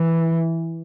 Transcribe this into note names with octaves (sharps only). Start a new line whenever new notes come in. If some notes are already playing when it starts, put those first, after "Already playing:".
Already playing: E3